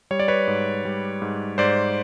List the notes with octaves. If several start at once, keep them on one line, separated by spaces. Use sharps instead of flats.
G3 C#5
D5
B4 C#5
G#2
G3
G#2
G#2 C5 D5